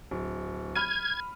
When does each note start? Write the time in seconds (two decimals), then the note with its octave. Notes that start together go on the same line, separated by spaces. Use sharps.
0.11 D1
0.75 B5 F6 G#6 D#7